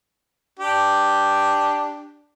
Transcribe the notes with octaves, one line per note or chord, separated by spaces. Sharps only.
D4 G4